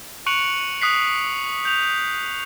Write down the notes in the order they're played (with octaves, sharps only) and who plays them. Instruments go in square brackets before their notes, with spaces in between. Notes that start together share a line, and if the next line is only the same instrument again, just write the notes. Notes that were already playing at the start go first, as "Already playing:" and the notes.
[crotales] C#6 F#6 C#7 D7 F7 F#7
D#6 F#6 B6 C7 F#7
G6 F7